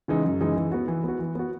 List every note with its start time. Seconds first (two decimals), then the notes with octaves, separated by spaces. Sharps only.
0.08 C#3 E3 G#3 D#4
0.25 F#2
0.40 C#3 E3 G#3 D#4
0.56 E3
0.72 B3 F#4
0.88 E3
1.04 B3 F#4
1.19 E3
1.35 B3 F#4